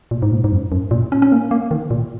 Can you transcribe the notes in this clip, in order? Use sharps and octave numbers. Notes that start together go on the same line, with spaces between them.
A#2
G#2
A#2
G#2
F#2
F#2
A#2
C#4
C#4
A#3
A#3
D#3
A#2